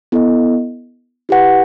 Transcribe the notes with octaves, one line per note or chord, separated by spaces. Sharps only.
B3 E4 A4 D#5
E4 G4 B4 F#5